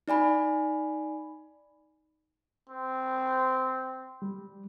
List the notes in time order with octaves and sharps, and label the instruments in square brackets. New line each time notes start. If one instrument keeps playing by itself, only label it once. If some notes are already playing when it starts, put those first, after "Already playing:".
[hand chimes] D#4 D5 G#5 B5
[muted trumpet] C4
[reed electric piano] G3